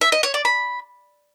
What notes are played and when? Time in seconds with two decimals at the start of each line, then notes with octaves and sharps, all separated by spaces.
0.01 E5
0.12 D#5
0.23 C#5
0.34 D5
0.45 B5